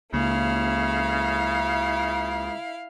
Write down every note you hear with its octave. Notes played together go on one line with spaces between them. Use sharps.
C#2 C#3 A#3 E4 F5